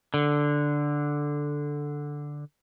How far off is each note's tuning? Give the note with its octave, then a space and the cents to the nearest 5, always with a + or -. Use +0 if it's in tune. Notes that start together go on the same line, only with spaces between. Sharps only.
D3 +0